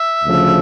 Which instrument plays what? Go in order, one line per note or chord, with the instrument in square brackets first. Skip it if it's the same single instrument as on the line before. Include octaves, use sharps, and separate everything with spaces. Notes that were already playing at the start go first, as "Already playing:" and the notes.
Already playing: [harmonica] E5
[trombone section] D2 C#3 F3